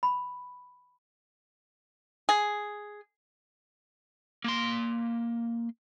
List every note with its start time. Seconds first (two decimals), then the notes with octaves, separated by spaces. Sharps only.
0.03 B5
2.29 G#4
4.44 A#3 C6